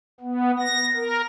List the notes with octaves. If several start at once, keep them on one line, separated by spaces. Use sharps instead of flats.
B3
A#6
A#4